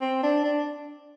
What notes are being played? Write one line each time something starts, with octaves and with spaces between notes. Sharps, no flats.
C4
D4
D4